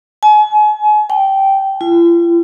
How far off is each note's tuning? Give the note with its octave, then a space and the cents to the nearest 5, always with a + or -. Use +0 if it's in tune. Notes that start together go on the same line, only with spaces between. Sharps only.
G#5 +40
G5 -10
F4 -45